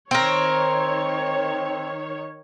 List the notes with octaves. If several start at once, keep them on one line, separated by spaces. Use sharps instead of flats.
D#3 C4 A#4 C#5